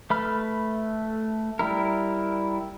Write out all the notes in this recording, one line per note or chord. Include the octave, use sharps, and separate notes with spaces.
A3 B4 B5 F6
G3 E4 A#4